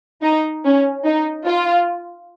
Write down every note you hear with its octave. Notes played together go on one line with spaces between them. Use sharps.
D#4
C#4
D#4
F4